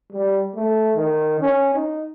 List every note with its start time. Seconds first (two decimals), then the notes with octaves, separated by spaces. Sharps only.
0.12 G3
0.55 A3
0.95 D#3
1.40 C#4
1.75 D#4